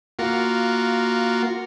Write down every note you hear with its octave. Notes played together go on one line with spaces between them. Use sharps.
A#3 F4 F#4